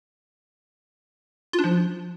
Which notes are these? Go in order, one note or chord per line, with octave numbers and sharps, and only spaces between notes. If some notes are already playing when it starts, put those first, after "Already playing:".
F4
D4
F3